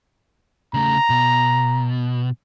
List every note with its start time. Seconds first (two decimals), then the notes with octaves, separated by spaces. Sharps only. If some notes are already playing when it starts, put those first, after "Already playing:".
0.74 C#3 A3 A#5
1.10 B2